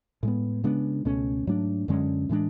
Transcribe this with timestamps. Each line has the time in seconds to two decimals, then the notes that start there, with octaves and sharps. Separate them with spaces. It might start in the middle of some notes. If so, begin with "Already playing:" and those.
0.23 A2 G#3 B3
0.64 C#3 G#3 B3 D4
1.05 C#2 B2 A3 C#4
1.47 G#2 F#3 A3 D4
1.88 F#2 D3 G#3 C#4
2.29 A2 E3 G#3 D4